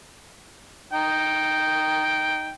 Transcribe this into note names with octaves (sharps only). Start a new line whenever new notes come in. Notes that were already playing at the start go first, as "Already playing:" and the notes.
D#4 G5